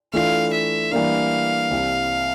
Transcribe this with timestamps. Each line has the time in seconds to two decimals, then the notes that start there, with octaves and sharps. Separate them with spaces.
0.13 E3 A3 D4 F4 A4 F5
0.53 E5
0.91 E3 G3 A#3 D4 F5
1.70 C2 C3 G3 C4